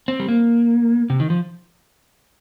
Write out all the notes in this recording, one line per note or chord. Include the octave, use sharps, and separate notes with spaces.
C4
G3
A#3
C3
D#3
F3